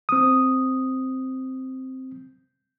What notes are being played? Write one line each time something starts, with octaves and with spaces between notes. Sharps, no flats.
C4 D#6